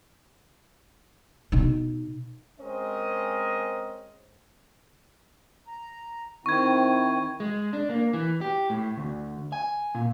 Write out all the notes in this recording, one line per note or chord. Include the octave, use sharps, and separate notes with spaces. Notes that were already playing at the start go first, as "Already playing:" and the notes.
B2 D#4
G#3 C4 C#4 A#4 C5 D#5
A#5
D#3 C4 E4 C#6 G#6
G#3
D4
A#3
E3
G4
A2
D2
G#5
A#2